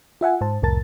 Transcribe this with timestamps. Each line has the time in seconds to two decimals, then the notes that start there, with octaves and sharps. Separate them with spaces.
0.21 F4 E5 F#5 G#5
0.41 G#2 C5 A5
0.62 C2 F2 A2 A#4 A5 A6